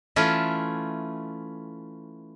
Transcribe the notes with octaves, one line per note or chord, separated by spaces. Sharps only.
E3 A3 C#4 F4